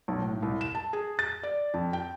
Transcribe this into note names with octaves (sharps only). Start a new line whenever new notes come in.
B1
A2
C2
E7
A5
G#4
A6
D5
F2
G5